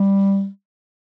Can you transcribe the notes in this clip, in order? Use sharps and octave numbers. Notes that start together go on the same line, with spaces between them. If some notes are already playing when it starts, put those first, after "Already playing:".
Already playing: G3